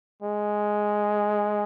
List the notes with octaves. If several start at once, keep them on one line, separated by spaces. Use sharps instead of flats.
G#3